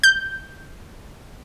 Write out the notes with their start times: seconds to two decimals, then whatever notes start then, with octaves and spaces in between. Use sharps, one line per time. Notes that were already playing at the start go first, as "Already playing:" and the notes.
0.04 G6